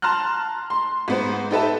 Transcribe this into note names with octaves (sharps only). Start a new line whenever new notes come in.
A5 A#5 C6 F6 F#6
C6
G#2 B3 C5
D#4 G4 A4 B4 E5 A5